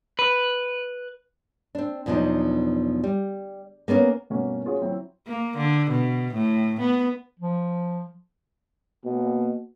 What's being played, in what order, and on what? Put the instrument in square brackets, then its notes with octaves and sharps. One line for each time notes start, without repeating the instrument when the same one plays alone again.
[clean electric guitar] B4
[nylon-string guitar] C4 D4
E2 B2 F3 F#3 D4 D#4
G3
A#3 B3 C#4 A4 A#4
[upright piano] G2 B2 A3 A#3 C#4
C#4 F4 F#4 G#4 C#5
F#3 C4 E4
[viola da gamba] A#3
D3
B2
A2
B3
[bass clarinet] F3
[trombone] B2 [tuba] A#3